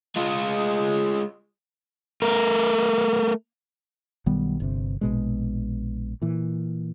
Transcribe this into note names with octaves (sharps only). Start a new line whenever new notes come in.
G#3 F4
A3 A#4
B1 D#3 G3 B3
G1 C3
A#1 B2 G#3
A#2 E3